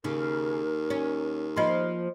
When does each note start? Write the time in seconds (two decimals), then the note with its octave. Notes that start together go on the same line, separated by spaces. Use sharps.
0.04 D#2 C#3 A#4
0.90 C#4
1.56 F3 A#3 F4 D#5 C6